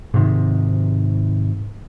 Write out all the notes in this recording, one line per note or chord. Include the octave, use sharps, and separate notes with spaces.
G#2 C3 D#3